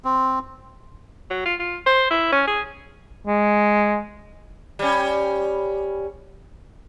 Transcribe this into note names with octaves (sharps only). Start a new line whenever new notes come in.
C4
F#3
F4
F4
C5
E4
C#4
G#4
G#3
G3 C#4